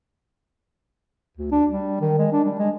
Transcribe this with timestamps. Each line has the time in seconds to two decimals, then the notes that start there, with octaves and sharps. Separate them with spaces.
1.37 D2
1.52 D4
1.70 G3
2.01 D#3
2.19 G#3
2.32 D4
2.45 G3
2.59 G#3